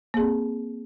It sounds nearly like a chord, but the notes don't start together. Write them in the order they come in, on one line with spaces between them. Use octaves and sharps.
A#3 G#4 C4